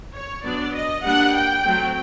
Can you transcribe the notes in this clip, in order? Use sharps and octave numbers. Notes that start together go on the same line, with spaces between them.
C#5
F#3 B3 D4 D5
D#5
G3 A#3 D4 F#5
G5
F#3 A3 C4